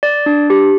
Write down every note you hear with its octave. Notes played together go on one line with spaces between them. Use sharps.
D5
D4
G4